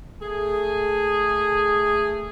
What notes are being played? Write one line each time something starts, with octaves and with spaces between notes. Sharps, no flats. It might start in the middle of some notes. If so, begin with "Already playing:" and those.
A3 G#4